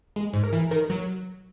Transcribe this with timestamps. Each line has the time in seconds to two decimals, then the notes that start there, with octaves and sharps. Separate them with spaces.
0.16 G#3
0.33 G#2
0.44 A#4
0.53 E3
0.71 D#3 A#4
0.90 F#3